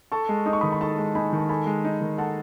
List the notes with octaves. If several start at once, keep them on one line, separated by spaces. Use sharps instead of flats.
A4 A5 C#6
G#3
D#4 D#6
C#6
D#3 B5 D#6
B5
A4 A5 C#6
G#3
D#4 G#5 B5
D#3 A5
A4 G#5 B5
G#3
D#4
D#3
A4 F#5 A5